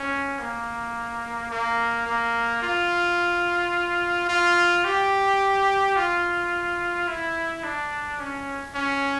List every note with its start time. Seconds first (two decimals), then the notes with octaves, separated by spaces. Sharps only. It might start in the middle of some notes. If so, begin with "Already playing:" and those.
Already playing: C#4
0.39 A#3
1.51 A#3
2.07 A#3
2.62 F4
4.28 F4
4.84 G4
5.96 F4
7.07 E4
7.63 D4
8.20 C#4
8.75 C#4